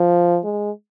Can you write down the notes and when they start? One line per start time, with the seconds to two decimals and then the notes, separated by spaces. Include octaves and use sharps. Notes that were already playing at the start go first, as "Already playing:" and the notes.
Already playing: F3
0.44 G#3